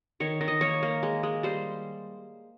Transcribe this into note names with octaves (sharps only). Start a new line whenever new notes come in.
D#3 C#5
D#3
D#5
A#3 C#5
A#3
G#3
G#3
G3 C5